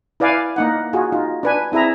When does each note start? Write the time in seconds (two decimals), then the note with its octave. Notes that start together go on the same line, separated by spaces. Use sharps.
0.20 E4 B4 D5 F5 G#5
0.56 A#3 D#4 F#5
0.93 F4 F#4 G#4
1.12 D#4 F4
1.43 D4 B4 G#5
1.72 C4 E4 G#4 E5 A#5